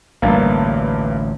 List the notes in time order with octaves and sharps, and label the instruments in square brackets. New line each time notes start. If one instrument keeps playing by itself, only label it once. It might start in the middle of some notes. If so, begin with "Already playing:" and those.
[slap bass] A1 D2 [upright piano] G2 A#3